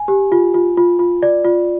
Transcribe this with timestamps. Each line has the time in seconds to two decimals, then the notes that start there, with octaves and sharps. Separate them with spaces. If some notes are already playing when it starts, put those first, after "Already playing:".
Already playing: G#5
0.08 G4
0.32 F4
0.54 F4
0.77 F4
0.99 F4
1.22 D5
1.45 F4